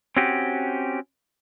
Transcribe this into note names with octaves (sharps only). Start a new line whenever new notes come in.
C4 C#4 F#4 G4